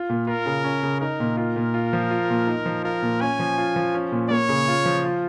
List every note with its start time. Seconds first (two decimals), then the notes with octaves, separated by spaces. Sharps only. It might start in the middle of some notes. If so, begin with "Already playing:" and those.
Already playing: F4
0.09 A#2
0.27 F4 A#4
0.46 C#3
0.64 C#4
0.83 C#3
1.01 D#4 A#4
1.20 A#2
1.37 F4 A#4
1.56 A#2
1.74 F4
1.93 F3
2.11 F4
2.30 A#2
2.47 D#4
2.66 F3
2.84 F4 A#4
3.02 A#2
3.21 C#4 G#5
3.39 F3
3.58 F4
3.76 F3
3.94 C#4
4.12 A#2
4.30 A#3 C#5
4.49 C#3
4.68 F4
4.85 F3
5.04 F4